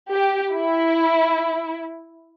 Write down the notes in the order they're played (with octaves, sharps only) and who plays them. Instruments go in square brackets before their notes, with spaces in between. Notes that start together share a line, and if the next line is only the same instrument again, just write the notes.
[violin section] G4
E4